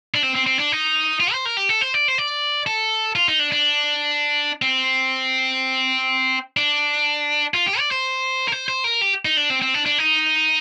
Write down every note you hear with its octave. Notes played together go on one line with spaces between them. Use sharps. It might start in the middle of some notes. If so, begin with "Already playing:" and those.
D4
C4
C4
C4
D4
D#4
F4
C5
A#4
G4
A4
C5
D5
C5
D5
A4
F4
D#4
D4
D4
C4
D4
F4
G4
D5
C5
A#4
C5
C5
A#4
G4
D#4
D4
C4
C4
D4
D4
D#4